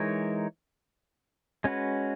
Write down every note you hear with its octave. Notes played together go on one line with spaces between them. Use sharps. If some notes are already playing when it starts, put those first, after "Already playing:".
Already playing: E3 G#3 D#4 A#4 C#5
G#3 C#4 F#4 B4